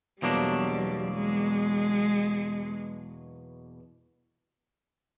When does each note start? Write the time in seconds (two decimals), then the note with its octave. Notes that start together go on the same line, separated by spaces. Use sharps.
0.22 E2 B2 F#3 G3 A#3 D4
1.12 G#3